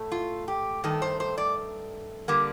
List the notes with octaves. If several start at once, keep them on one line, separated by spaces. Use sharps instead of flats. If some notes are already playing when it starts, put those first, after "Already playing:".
Already playing: A2 A3
F4
G4
G2 D#3 A3 A4
C5
C5
D5
D3 G3 A#3